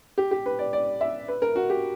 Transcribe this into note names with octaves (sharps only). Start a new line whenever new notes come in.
G4
G4
B4
D5
D5
E5
B4
A#4
F#4
G4